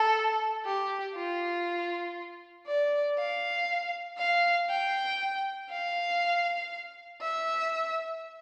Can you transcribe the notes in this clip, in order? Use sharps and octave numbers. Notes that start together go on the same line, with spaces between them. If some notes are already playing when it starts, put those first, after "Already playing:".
Already playing: A4
G4
F4
D5
F5
F5
G5
F5
E5